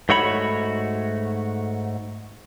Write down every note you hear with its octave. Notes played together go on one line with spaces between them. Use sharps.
G#2 A3 F#4 C#5 B5